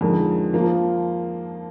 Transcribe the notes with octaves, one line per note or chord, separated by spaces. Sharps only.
F2 D3 G#3 D#4 A#4
F3 A#3 F4